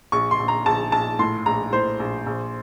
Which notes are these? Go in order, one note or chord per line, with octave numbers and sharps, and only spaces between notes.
A#1 C#6
C6
A#1
A#5
A#1 A5
A#1 A5
A2 C6
A#1 A#5
A2 C5
A#1
A#1